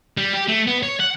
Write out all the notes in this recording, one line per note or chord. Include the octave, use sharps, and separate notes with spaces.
G3
G4
A3
B3
C#5
F#5